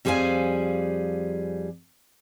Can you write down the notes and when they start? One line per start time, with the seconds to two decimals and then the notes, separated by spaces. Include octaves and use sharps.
0.05 F2 G3 G#4 C5 F5 G#5